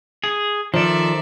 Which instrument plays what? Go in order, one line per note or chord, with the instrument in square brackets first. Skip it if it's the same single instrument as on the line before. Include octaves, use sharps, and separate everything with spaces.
[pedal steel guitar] G#4
[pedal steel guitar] D#3 A4 [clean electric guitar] F3 [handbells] C5 [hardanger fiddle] D5 E5